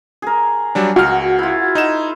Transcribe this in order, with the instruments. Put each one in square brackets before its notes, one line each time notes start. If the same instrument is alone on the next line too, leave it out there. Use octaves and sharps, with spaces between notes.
[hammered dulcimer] G#4 A#4
[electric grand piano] F#3 G3 D4
[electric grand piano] C#2 F6 [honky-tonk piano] F#4
[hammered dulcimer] E4 F4
[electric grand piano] D#4 D#5 E7